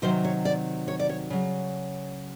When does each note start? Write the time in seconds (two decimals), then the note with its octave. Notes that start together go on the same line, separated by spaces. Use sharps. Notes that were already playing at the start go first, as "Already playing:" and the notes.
0.02 C3 D#3 F#3 C5
0.25 C#5
0.45 D5
0.88 C#5
0.99 D5
1.09 C#5
1.30 C#3 F#3